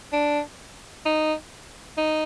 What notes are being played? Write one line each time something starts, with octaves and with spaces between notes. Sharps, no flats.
D4
D#4
D#4